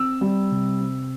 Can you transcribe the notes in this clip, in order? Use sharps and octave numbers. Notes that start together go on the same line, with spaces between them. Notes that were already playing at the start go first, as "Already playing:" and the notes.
Already playing: C4 E6
G3
C3
C4